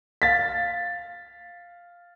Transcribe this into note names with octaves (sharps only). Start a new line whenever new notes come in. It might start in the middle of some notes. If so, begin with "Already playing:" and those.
F5 A6 B6